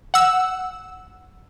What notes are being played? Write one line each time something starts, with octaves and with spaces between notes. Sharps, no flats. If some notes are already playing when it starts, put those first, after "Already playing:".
F#5 E6